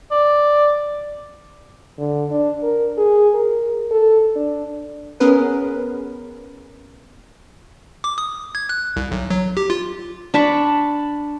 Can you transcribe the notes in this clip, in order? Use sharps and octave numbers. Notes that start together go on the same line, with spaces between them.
D5
D3
D4
A#4
G#4
A#4
A4
D4
B3 C#4 G#4 A#4 B4
D6
D#6
G#6
F#6
C2
B1
F#3
G4
F4
D4 A5 B5 C#6